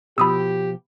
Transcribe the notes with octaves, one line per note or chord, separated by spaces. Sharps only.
B2 F3 G4 B5 D#6 E6